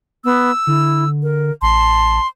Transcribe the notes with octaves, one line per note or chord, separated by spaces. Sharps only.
B3 E6
D3 E4
A#4
A1 A5 C6